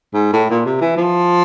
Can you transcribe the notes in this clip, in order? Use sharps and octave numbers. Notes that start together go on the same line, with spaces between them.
G#2
A2
A#2
C3
E3
F3